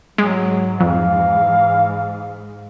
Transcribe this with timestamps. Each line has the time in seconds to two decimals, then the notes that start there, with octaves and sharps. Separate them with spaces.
0.18 G#2 F#3 G#3
0.80 F2 E3 F5